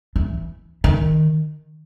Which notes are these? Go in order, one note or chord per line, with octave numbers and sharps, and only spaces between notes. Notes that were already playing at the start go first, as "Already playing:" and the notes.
E3
D#3